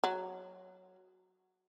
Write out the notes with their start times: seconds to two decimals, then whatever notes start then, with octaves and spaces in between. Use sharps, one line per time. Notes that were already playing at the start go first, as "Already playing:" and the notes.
0.04 F#3